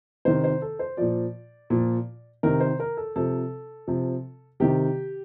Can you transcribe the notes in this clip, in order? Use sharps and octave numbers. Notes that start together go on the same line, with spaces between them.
C3 D#3 C5
C5
A4
C5
A#2 F3 D5
A#2 F3
C3 D#3 A#4
C5
A#4
A4
C3 F3 A4
C3 F3
C3 D#3 G4